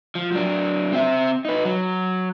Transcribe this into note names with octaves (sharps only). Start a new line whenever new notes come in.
F3
F#3 D4
C4 E5
D#4 B4
F#3